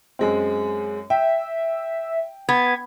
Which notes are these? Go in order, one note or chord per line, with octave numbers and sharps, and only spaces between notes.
F#2 G#3 C4
E5 G5
B3 G#6